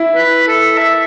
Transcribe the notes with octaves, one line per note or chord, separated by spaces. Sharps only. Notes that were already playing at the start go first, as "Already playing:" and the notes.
Already playing: E4
B4
A4
E5